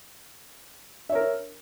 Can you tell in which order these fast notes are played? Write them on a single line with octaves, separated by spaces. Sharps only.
E5 C#5 A#4